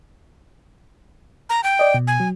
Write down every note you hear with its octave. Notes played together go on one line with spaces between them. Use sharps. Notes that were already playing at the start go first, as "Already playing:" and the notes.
A#5
G5
D5 D#5
B2
G#5
F#3